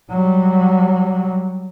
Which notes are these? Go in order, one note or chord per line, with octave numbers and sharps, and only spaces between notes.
F#3 G3